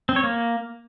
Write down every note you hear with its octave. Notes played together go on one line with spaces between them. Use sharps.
C4
C#5
A#3